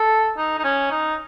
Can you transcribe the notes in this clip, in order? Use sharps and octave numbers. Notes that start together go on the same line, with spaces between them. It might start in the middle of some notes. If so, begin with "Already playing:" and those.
Already playing: A4
D#4
D#4
C#4
D#4